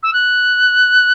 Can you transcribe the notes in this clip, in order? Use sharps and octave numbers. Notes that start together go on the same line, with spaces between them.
E6
F#6